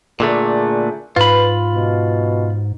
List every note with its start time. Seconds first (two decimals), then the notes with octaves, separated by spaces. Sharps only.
0.20 A#2 D3 A3 G#4
1.16 G#2 F4 B4 B5
1.75 B2